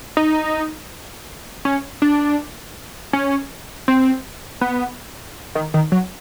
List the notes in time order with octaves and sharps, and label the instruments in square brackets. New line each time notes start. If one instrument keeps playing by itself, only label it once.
[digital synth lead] D#4
C#4
D4
C#4
C4
B3
D#3
D#3
F#3